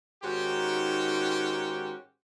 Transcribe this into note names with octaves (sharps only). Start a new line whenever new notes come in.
G#2 D#3 C#4 F#4 G4